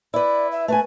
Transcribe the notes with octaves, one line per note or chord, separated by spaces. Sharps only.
E4 B4 D5
E5
A3 B4 G#5